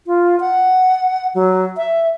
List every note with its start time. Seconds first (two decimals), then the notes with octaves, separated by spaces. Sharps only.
0.07 F4
0.40 F#5
1.35 F#3
1.77 E5